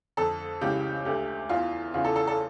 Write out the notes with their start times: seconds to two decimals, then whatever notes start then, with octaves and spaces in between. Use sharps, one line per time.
0.17 F2 D3 A4
0.61 C#2 C#3 E3 G4
1.05 D2 D3 G4
1.49 E2 E3 F4
1.94 E2 C#3 E3 F4
2.05 A4
2.16 A4
2.27 A4